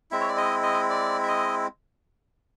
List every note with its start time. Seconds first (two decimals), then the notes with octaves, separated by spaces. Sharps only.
0.11 G#3 C4 E4 E5
0.21 C#5
0.29 D5
0.37 D#5
0.63 D#5
0.90 D5
1.23 E5
1.28 D#5